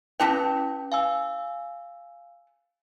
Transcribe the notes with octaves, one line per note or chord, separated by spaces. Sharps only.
C#4 E4 G4 A4 B4 G5
F5 G#5 E6